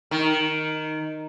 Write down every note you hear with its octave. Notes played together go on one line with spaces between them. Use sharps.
D#3